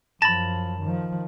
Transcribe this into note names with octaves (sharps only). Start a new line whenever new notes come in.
F#2 F3 A5 B5 A6 A#6
D#3 F3